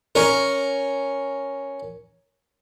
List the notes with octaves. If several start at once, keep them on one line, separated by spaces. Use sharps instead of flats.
C#4 A#4